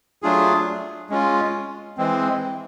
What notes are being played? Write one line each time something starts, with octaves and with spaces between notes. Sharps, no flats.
F#3 A3 D4 F4 G#4
G#3 C#4 F4
E3 G#3 C4